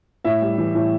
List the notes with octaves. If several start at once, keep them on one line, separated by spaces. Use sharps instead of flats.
A2 E5
G3
E3
A2